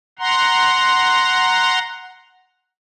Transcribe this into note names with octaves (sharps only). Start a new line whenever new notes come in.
F#5 A#5 C6